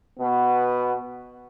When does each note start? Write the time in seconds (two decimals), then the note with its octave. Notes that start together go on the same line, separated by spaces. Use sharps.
0.19 B2 B3